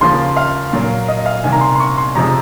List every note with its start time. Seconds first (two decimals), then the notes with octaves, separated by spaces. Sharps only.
0.01 D#2 C#3 F3 A#3 C6
0.36 F5
0.73 A#2 F#3 A#3
1.08 D#5
1.26 F5
1.43 C2 C3 D#3 A#3 G#5
1.52 A#5
1.61 C6
1.75 C6
1.80 C#6
1.98 C6
2.15 F2 C3 F3 G#3 A#5